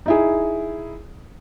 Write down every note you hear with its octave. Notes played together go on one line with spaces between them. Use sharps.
D#4 E4 G#4